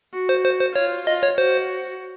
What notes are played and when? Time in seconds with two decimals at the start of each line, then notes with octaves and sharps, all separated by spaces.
0.14 F#4
0.29 C5
0.45 C5
0.60 C5
0.76 F4 C#5
1.07 F4 D#5
1.23 C#5
1.38 F#4 C5